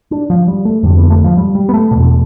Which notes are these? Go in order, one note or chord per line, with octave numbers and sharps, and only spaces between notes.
D4
F3
G3
A3
F2 D3 G3
B3
A3
F3
G3
G3
B3
A3
E2 B2